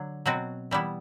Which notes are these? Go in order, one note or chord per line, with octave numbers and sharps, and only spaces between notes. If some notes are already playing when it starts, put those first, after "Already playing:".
Already playing: D3 F#3
B2 F#3 C4 F#4
E3 G3 B3 E4